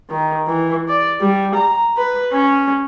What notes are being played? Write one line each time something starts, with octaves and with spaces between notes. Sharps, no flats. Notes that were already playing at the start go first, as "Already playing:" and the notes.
D#3
E3
D5
G3
A#5
B4
C#4